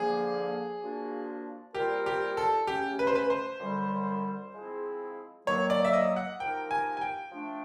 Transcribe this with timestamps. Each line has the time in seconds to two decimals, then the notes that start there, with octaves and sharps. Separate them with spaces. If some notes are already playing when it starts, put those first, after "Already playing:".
Already playing: D3 F3 A#3 G#4
0.82 A#2 F3 A#3 D4 F#4
1.75 A#2 G3 C4 F4 G4 A#4
2.06 G4
2.37 A4
2.67 C#3 F#3 A3 C#4 G4
2.99 B4
3.07 C5
3.15 B4
3.30 C5
3.61 F#2 D3 G3
4.54 F3 G#3 C4 E4 G#4
5.47 D#3 F#3 A#3 C#5
5.70 D5
5.85 E5
5.93 D#5
6.16 F#5
6.40 F3 A#3 D#4 G4 A#4 G5
6.71 G#5
6.97 G#5
7.01 G5
7.32 F3 A3 D4